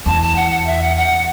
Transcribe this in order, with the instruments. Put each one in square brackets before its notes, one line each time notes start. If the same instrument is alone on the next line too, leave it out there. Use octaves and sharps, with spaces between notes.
[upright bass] E2 [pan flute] A5
[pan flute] A5
F#5
F#5
E5
F#5
F#5